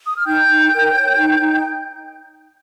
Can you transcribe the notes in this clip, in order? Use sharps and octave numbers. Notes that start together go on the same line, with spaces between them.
D#6
F6
D#4 G5 G6
D#4
A#4
C#5
D#4
D#4